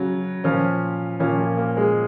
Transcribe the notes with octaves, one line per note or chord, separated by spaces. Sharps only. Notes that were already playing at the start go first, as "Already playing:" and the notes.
Already playing: C#3 F#3
A#2 F3 C#4
A#2 F3 C#4
A#3
A#3
G#3